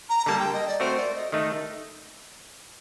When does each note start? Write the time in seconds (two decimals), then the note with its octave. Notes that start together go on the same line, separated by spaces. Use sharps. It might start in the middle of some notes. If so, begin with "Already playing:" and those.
0.09 A#5
0.26 D3 G3 A#3 A5
0.39 G5
0.53 D#5
0.67 D5
0.80 A3 C4 F#4 A#4 C5
0.97 D5
1.15 D#5
1.32 D#3 A3 D#4 D#5